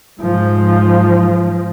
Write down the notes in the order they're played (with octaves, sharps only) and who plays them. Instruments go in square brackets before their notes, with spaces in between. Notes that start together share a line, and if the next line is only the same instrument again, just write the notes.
[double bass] G#2 F3